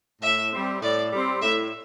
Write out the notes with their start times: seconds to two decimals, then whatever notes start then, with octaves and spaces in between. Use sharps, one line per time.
0.22 A2 E5
0.52 G3 C4
0.82 A2 D5
1.12 G3 C4
1.41 A2 E5